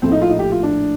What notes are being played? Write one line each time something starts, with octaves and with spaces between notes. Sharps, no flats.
A#1 A2 A3 C4
D#4
F4
D#4
G4
F4
D4